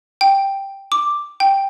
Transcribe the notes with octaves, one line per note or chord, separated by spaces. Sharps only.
G5
D6
G5